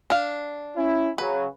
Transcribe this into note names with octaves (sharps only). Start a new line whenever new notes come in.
D4 F5
C#4 E4
C#3 F#3 B4